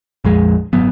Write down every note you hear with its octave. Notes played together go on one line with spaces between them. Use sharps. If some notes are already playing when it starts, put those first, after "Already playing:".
A#1 F2 G#3
F#1 G#2 F#3 B3